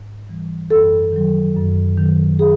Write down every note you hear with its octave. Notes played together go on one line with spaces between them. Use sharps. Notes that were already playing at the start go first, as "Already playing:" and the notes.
Already playing: G#2
E3 G3
F#2 A4
D#3 F#3
F#2
D#3 F#3
G#4